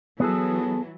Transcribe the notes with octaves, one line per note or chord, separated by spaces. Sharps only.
E3 F#3 B3 G#4 A4